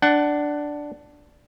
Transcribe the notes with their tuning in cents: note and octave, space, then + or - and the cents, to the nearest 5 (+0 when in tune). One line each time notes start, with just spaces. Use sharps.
D4 +0 F#5 +20